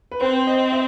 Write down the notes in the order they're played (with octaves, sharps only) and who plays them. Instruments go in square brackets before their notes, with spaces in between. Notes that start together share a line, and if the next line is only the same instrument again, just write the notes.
[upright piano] B4
[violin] C4 [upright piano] C5
[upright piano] D#5
E5